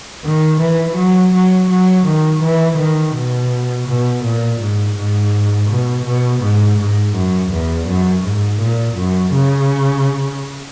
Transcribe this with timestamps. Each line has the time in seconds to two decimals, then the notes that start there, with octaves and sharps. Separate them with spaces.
0.24 D#3
0.61 E3
0.97 F#3
1.34 F#3
1.70 F#3
2.06 D#3
2.43 E3
2.78 D#3
3.15 B2
3.87 B2
4.25 A#2
4.61 G#2
4.96 G#2
5.70 B2
6.06 B2
6.42 G#2
6.79 G#2
7.15 F#2
7.51 E2
7.87 F#2
8.24 G#2
8.61 A#2
8.96 F#2
9.33 C#3